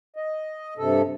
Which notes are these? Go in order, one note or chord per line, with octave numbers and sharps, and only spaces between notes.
D#5
G2 C3 A4